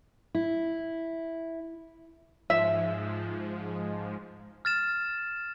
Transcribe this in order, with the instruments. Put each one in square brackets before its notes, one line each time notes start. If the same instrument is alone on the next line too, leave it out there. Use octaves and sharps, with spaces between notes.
[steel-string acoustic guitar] E4
[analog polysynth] G#2 F3 G#3 [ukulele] E5
[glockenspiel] F6 A6 E7